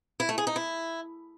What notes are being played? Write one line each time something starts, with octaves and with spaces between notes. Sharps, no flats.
E4
A3
G#4
D#4
E4